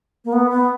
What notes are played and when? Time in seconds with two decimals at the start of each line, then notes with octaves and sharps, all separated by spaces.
0.25 A#3
0.33 B3
0.51 B3